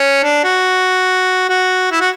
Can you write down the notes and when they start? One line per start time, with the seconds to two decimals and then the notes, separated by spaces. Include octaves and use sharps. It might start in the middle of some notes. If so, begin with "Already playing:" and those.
Already playing: C#4
0.23 D4
0.44 F#4
1.49 F#4
1.92 E4
2.01 F#4